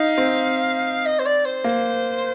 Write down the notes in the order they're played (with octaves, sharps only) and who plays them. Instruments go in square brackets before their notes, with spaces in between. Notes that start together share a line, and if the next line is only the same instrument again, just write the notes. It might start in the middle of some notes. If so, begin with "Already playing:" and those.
Already playing: [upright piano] D#4 [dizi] F5
[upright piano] C4
[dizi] D#5
C5
D5
C5
[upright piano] A#3